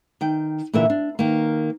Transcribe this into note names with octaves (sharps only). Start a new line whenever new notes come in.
D#3 G5
A#2 D3 E3 A#4 E5
D4
D#3 A#3